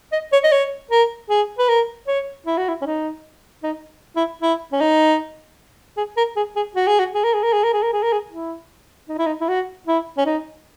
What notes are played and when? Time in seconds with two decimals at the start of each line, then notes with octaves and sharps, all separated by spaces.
0.12 D#5
0.33 C#5
0.44 D#5
0.52 C#5
0.91 A#4
1.30 G#4
1.58 B4
1.69 A#4
2.08 C#5
2.46 E4
2.57 F#4
2.69 E4
2.82 C#4
2.86 D#4
3.63 D#4
4.16 E4
4.42 E4
4.72 C#4
4.81 D#4
5.97 G#4
6.17 A#4
6.36 G#4
6.56 G#4
6.75 F#4
6.87 G#4
6.99 F#4
7.15 G#4
7.24 A#4
7.34 G#4
7.43 A#4
7.53 G#4
7.64 A#4
7.73 G#4
7.83 A#4
7.93 G#4
8.03 A#4
8.12 G#4
8.31 E4
9.09 D#4
9.18 E4
9.26 D#4
9.41 E4
9.48 F#4
9.87 E4
10.18 C#4
10.26 D#4